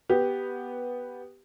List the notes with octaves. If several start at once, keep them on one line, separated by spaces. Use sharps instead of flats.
B3 G4